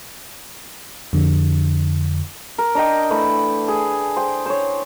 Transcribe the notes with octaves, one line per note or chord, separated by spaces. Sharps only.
F2 D3
A#4
D4 A#4 D#5 G5
E3 A3 B4
G#4
C5 G5
C5 C#5